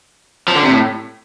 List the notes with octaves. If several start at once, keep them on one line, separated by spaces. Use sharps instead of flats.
F3
D3
C3
A2